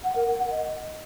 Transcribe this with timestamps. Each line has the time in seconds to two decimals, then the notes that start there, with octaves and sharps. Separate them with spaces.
0.04 F#5
0.16 A#4
0.27 F#5
0.39 F#5
0.51 D#5